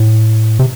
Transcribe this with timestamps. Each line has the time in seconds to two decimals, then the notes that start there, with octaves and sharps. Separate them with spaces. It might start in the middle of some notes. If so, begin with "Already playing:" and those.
Already playing: A2
0.59 C3